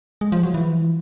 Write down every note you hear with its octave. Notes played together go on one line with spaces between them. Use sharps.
G#3
F3
F#3
E3